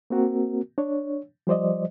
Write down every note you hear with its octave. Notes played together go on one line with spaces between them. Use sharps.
A#3 C4 F#4 A#4
D4 C#5
F3 G3 C5 D5 D#5